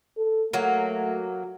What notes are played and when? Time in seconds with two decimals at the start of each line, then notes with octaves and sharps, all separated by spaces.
0.17 A4
0.53 F#3 A3 A#3